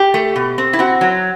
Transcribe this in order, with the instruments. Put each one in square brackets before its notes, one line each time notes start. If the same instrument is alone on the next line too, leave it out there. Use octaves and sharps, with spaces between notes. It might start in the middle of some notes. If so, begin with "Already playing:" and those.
Already playing: [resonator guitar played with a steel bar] G4
A3
B2
C4
E4
C4 F#4
F#3